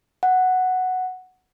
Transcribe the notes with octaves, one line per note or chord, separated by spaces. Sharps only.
F#5